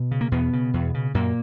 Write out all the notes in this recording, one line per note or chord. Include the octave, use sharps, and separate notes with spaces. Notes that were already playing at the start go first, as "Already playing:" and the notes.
Already playing: B2
C#3
A#3
E2 B2 B3
C#3
E2
C#3
F#2 A#2 A#3